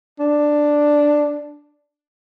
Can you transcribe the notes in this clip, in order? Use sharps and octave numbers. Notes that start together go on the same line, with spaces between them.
D4